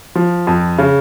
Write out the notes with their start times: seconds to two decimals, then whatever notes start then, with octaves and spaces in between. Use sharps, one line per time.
0.15 F3
0.47 F2
0.78 C#3